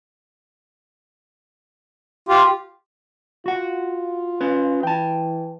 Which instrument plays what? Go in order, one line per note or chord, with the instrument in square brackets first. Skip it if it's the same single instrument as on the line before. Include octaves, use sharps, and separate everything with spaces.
[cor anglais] F4 [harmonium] G4
[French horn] F4 [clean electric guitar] F#4 F#5
[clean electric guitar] C#4 B4
[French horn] E3 [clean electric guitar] G5 A5